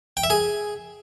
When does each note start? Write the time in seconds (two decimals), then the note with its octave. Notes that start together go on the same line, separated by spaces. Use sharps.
0.17 G5
0.24 E5
0.30 G#4